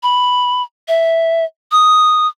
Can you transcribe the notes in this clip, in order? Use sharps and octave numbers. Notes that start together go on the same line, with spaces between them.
B5
E5
D#6